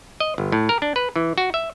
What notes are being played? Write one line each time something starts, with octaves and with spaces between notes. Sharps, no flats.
D#5
G1
A2
A#4
D4
B4
E3
F#4
E5